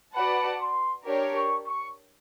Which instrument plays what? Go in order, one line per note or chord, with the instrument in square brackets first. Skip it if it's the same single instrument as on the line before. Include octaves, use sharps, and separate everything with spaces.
[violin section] F#4 B4 D5 F#5 A5 [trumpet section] B5
[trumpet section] C6
[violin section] D4 G4 A#4 C#5
[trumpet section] C#6
C#6